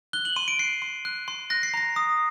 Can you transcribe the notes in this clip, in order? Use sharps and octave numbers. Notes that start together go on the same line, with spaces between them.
F#6 G7
F#7
C6 D#7
D7
F#6 C7
C6
F#6
C6
F#6 A#6
C7
A#5 A#6
D#6